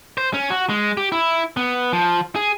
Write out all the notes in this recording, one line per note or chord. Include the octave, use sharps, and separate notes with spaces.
C5
C#4
F#4
G#3
G4
E4
B3
F3
G#4